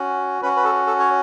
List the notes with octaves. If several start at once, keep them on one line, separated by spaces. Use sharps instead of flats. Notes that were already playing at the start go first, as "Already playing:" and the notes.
Already playing: C#4 F#4
C#4 F#4 B4
B4
A4
A4
C#5